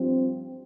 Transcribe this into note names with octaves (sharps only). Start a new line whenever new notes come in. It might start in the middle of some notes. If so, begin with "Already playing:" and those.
Already playing: G2 F3 C4